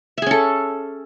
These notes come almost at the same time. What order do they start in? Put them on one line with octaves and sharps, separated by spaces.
E5 G#4 C#4 A4